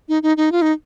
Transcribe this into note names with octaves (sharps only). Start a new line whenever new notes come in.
D#4
D#4
D#4
F4
D#4